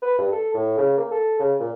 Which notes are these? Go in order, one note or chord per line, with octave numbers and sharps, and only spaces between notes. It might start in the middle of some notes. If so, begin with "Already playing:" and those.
B4
G2
A4
A2
C#3
A#3
A4
C#3
A#2